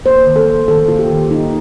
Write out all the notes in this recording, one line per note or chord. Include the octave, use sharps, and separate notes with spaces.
A#3 C5
D#3
A4
A#3
D#3 A4
A#3 F4
G4
D#3
A#3 D#4